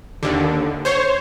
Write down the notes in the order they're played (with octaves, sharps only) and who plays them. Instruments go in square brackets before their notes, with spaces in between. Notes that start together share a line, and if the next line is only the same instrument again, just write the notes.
[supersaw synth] D#2 D3
C5 C#5